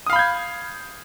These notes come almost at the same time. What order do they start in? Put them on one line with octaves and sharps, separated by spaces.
D#6 F5 B5 G6 G#6